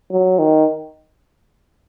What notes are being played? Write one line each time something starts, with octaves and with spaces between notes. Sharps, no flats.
F#3
D#3